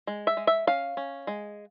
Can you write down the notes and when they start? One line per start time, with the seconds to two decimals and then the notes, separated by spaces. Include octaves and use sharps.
0.07 G#3
0.27 E5
0.37 G#3
0.47 E5
0.67 C#4 F5
0.97 C#4
1.27 G#3